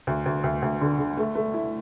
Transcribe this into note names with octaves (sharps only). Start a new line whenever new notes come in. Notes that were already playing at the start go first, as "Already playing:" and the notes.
D2
D2
D2
D2
D3
D3
A3
A3
E4